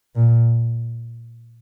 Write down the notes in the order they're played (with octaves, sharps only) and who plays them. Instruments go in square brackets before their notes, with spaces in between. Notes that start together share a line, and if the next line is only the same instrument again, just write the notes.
[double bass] A#2